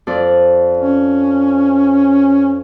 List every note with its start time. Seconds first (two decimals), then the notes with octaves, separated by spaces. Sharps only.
0.07 F2 D5
0.77 C#4